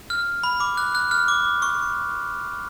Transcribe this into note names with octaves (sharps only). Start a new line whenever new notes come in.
F6
B5
D6
F#6
F#6
F6
D6
C#6